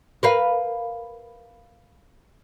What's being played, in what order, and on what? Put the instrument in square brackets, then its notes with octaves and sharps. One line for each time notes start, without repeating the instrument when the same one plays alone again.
[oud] A#4 B4 F5